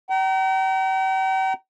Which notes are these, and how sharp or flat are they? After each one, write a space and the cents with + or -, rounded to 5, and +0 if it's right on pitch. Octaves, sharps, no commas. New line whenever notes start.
G5 -45 A#5 +0